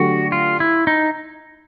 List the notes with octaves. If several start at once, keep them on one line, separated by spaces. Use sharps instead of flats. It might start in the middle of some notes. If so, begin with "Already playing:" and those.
Already playing: D3 F#3 A3 D4 F#4 G4
F4
E4
D#4